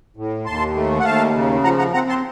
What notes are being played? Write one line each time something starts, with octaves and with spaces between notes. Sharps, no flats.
A2
D#2 A5 C6
A3
F#5
D#2 F5 A5
C#3
F3 F#5 A#5
F#5 A#5
C4 F#5 A#5
A5 C6